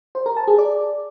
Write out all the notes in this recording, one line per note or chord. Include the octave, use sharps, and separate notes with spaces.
C5
A#4
A5
G#4
D5